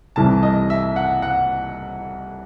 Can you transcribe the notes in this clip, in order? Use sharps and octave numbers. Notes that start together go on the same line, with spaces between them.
C2 C3 E3 A3 A5
D#5
E5
F#5
F#5